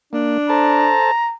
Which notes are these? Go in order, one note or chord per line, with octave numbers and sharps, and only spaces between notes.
A#3 D4
A4 C5 A5 A#5